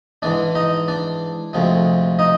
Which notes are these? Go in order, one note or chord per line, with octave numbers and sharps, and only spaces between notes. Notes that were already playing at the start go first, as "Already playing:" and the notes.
G#2 E3 G#3 D4 D5
D#4 D#5
D4 D5
D2 C3 F3 G#3
D#4 D#5